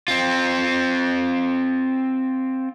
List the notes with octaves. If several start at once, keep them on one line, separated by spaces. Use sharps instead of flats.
C4 F4